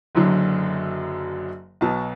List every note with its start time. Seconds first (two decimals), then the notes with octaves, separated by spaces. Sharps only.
0.15 F#1 F#2 D3 F#3
1.81 B1 B2 F#3 A5